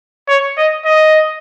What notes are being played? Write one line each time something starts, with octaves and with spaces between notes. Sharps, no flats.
C#5
D#5
D#5